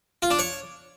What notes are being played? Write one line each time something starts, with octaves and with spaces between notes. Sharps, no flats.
F4
D4
C#5